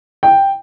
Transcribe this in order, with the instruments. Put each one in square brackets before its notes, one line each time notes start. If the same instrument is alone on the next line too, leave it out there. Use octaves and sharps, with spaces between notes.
[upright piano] G5